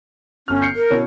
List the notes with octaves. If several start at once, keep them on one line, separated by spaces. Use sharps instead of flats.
G1 C#4 F6
G6 C7 C#7
A#4
B2 C#4 E4